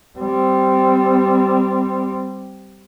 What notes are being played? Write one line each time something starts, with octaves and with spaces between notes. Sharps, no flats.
G3 C4